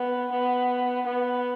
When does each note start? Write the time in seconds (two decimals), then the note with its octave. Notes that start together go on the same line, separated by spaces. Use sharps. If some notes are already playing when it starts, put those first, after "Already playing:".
Already playing: B3
0.31 B3
1.06 B3